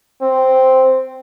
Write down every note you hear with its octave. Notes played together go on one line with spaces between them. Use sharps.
C4